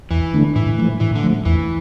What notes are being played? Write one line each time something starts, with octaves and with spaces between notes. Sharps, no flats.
E2 E3
D3 A3 D4
A2 E3
F3 A3
A2 E3
D3
F3 A3
E2 E3